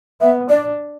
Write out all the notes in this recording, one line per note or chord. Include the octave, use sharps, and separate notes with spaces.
B3 E5
D4 D5